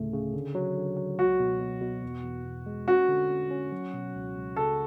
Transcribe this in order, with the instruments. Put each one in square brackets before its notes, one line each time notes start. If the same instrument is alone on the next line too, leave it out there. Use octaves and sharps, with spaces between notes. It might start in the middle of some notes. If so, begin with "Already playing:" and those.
Already playing: [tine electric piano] D2 A2 C#3 A3
C#3
D3
F#3
D3
F#3
[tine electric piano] C#2 [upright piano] F#4
[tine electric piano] B2
B2
B2
E2
E2
E2
G#3
[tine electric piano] C#4 [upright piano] F#4
[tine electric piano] D3
C#4
C#4
F#3
B2
C#2
C#2
[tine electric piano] C#3 [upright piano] A4